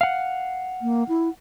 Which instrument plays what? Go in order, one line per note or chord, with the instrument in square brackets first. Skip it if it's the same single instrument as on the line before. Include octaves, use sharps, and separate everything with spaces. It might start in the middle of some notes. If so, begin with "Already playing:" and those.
[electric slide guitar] F5 F#5
[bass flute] A#3
E4